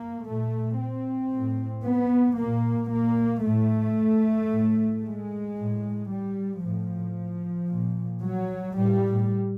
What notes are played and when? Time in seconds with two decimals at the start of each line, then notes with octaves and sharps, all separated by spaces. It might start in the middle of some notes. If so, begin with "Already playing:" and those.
Already playing: A#3
0.25 A#2 A3
0.78 C4
1.32 A2
1.84 B3
2.38 A#2 A#3
2.91 A#3
3.44 A2 A3
4.50 A2
5.03 G#3
5.56 A2
6.10 G3
6.63 A2 F3
7.69 A#2
8.22 F#3
8.75 A2 G3